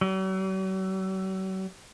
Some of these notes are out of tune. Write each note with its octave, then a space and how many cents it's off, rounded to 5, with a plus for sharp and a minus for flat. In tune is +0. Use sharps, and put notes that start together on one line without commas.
F#3 +45